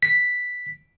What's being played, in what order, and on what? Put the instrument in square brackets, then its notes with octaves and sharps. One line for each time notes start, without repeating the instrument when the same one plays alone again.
[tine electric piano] B6